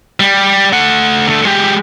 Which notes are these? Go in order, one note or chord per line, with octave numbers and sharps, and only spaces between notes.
G3
A3 F#5
D3 A3
G#3 G4